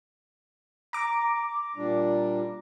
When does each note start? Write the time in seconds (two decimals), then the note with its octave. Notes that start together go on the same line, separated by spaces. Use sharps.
0.93 A#5 D6
1.76 A#2 G3 D4